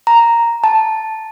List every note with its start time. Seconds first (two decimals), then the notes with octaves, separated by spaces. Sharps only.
0.07 A#5
0.64 A5